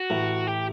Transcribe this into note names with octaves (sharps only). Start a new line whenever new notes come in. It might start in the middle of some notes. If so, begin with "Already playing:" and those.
Already playing: F#4
A1 A2
G4